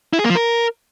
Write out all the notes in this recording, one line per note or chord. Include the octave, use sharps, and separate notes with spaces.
E4
G#4
A#3
F3
A#4